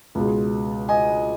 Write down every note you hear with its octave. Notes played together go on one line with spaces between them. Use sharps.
C#2 B2 G#3
D#5 G#5